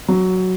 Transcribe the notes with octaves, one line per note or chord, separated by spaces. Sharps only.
F#3